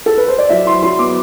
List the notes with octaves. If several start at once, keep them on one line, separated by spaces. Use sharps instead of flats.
A4
B4
C5
D5
F#3 E5
E4 C6
F#3 C6
B3 D6